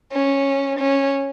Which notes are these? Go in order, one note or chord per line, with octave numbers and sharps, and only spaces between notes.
C#4
C#4